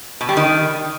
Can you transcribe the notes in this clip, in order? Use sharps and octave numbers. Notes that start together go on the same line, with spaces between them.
B2
G3
D#3